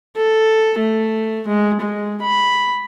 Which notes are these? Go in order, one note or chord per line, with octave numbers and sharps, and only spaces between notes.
A4
A3
G#3
G#3
B5